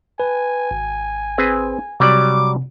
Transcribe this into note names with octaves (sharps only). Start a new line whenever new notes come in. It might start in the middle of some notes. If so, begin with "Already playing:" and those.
B4 G#5
G#1
C4 G#4 B4
C3 F#3 G3 D5 D6